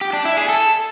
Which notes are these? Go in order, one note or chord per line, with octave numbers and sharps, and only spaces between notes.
G4
D4
E4
G#4
A4